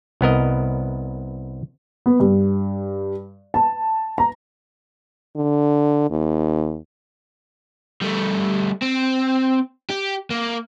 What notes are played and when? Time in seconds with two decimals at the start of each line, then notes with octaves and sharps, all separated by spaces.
0.21 C2 B3 A#4 D#5
2.06 B3
2.20 G2
3.54 A5
4.18 A#5
5.36 D3
6.11 D#2
8.02 G3 A3
8.82 C4
9.90 G4
10.31 A#3